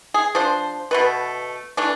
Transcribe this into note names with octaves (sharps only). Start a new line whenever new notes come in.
G#4
F3 D4 C5
B2 A3 B4
E3 A3 D4